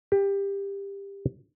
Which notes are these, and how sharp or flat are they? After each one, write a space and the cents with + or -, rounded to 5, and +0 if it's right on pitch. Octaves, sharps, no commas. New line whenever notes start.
G4 +20